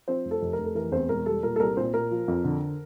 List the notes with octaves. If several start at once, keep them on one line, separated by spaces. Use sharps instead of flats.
F3 C4 C5
F1
A4
F1
F1 A#4
A4
E3 A#4
E2 C4 C5
E1 A#4
G3 A4
A#2 A#4
A4
C2 A#4
A#2 C4 C5
A#2 A#4
F3
F2
D3